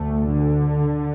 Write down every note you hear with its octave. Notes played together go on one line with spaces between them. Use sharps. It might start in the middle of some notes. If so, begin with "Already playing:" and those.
Already playing: D2 A3
D3